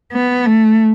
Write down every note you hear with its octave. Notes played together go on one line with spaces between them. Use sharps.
B3
A3